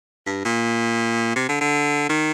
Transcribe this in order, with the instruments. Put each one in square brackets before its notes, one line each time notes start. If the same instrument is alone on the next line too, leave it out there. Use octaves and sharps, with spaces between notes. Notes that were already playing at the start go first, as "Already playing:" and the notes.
[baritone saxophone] G2
A#2
C3
D3
D3
D#3